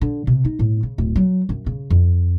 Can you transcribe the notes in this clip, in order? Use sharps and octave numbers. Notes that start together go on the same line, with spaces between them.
D3
C3
D#4
A2
C#3
D1
F#3
F#2
C#3
F2